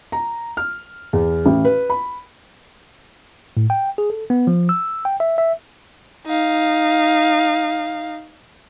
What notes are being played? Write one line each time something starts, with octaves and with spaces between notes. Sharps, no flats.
A#5
F6
E2
A1
B4
B5
A2
G5
G#4
A4
B3
F3
E6
G5
E5
E5
D#4 F5